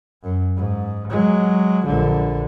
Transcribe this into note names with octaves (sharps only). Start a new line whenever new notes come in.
F#2
G#2
F#3 G#3
A#1 D3